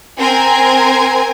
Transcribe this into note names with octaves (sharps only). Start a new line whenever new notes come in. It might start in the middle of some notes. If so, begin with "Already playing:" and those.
C4 A#4 G#5